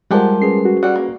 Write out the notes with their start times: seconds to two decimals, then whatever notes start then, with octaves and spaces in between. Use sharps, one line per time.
0.11 F3 G3 G#3 G4 A#4 F#5
0.42 C#4 G#4 B4 C7
0.65 F#4
0.83 G3 F#4 F#5
0.96 A#3